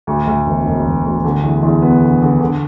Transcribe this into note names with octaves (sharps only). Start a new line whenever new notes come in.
D2
D2
E1
E1
E1
D2
D3
E2
E2
B3
D3
D3
D3